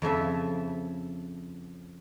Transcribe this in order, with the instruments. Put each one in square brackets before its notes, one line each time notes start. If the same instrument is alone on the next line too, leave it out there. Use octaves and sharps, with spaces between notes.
[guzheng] F2 C#3 F3 E5